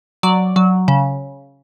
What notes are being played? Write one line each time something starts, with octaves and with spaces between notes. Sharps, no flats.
F#3 D5
F#3
C#3